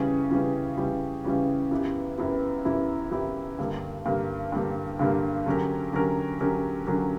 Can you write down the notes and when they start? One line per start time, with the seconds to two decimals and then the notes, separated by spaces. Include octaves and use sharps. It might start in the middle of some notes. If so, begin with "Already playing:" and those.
Already playing: C#3 E3 G3 C#4
0.30 C#3 E3 G3 C#4
0.77 C#3 E3 G3 C#4
1.24 C#3 E3 G3 C#4
1.71 F#2 E3 B3 E4 G4
2.18 F#2 E3 B3 E4 G4
2.65 F#2 E3 B3 E4 G4
3.11 F#2 E3 B3 E4 G4
3.59 G2 D3 G3 A#3
4.06 G2 D3 G3 A#3
4.52 G2 D3 G3 A#3
4.99 G2 D3 G3 A#3
5.46 D3 F#3 C#4 G4 A#4
5.93 D3 F#3 C#4 G4 A#4
6.41 D3 F#3 C#4 G4 A#4
6.87 D3 F#3 C#4 G4 A#4